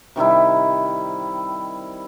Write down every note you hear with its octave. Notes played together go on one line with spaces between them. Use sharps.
C3 D#3 G3 E4